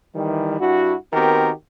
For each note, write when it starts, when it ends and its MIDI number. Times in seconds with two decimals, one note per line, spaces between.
0.15 0.57 51
0.15 0.57 52
0.15 0.57 55
0.60 0.94 43
0.60 0.94 62
0.60 0.94 64
0.60 0.94 66
1.12 1.50 51
1.12 1.50 59
1.12 1.50 60
1.12 1.50 66
1.12 1.50 67
1.12 1.50 70